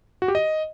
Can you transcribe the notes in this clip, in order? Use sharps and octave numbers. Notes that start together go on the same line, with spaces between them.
F#4
G4
D#5